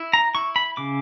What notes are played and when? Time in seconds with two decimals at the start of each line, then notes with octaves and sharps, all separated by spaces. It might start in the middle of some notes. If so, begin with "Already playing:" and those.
Already playing: E4
0.13 A#5
0.35 E4 C#6
0.56 B5
0.77 C#3 D6